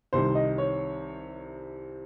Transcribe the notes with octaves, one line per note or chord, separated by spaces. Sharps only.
C2 C3 D#3 C5
D#5
C#5